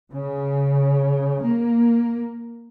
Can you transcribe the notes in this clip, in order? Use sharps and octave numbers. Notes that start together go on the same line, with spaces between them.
C#3
A#3